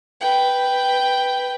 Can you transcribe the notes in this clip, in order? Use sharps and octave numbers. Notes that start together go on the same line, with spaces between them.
B4 G5